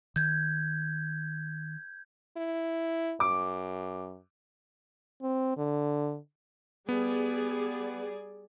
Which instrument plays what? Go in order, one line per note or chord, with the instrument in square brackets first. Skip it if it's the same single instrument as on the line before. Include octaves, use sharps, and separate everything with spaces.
[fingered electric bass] D#3 [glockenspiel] G6 G#6
[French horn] E4
[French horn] F#2 [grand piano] D6
[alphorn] C4
D3
[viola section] G3 G#4 D5 [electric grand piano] B3